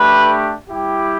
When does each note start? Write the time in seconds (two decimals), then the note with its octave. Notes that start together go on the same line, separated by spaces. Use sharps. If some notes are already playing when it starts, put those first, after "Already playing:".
Already playing: A3 D4 G4 B4
0.70 G3 E4 G4